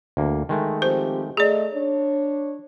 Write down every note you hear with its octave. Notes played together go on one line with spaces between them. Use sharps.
D2 A#3
D#3 G#3 A3
F3 C4 G4 C5
A3 G#4 D5 D#5 A#5
D4 C#5